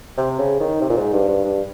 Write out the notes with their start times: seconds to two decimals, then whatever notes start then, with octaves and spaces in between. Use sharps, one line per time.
0.17 C3
0.39 C#3
0.60 D#3
0.81 C3
0.89 A#2
0.97 G#2
1.13 G2
1.28 G2
1.44 G2